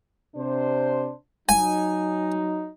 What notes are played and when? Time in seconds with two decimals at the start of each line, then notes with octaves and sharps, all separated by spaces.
0.36 C3 D4 C5
1.49 F#3 D#4 G#5